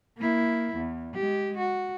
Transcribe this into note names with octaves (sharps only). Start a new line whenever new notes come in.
A#3 E4
E2
G#3 G4
F#4